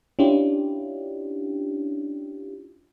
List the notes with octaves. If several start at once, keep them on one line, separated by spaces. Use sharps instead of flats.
C#4 D4 E4 F4 G4